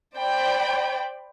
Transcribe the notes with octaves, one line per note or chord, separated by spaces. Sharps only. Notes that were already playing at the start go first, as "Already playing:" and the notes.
C5 D5 G5 B5